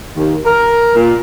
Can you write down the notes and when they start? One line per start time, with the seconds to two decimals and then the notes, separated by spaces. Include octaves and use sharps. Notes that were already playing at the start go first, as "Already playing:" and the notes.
0.15 D#2
0.45 A#4
0.95 A#2